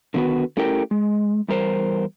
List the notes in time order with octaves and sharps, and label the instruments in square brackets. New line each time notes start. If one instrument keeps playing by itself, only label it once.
[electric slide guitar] D3 D#3 B3 F#4 B4
A3 C#4 E4 G4 A#4 G5
G#3
E2 G3 A#4 C5